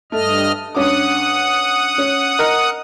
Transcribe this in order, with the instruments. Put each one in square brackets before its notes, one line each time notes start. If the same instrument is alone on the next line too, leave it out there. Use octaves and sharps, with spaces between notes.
[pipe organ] G2 D#5 F6 [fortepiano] A3
[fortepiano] G2 C#4 D6 [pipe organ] F#5 D#6
[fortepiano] C#4
A#4 D#5 F6